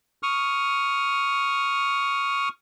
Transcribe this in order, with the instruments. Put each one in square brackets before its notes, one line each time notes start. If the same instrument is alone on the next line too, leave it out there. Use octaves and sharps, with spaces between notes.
[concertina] C#6 D#6 F6